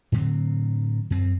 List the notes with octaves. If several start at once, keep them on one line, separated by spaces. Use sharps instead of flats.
A2 D3 F#3 C4
F#2 C4